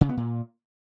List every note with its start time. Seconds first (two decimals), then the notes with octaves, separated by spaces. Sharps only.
0.01 C#3
0.09 B3
0.17 A#2